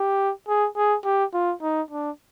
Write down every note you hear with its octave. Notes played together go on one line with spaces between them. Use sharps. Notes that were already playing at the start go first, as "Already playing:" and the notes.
Already playing: G4
G#4
G#4
G4
F4
D#4
D4